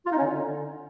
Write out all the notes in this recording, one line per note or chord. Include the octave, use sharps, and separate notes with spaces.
F4
D#4
C#4
D3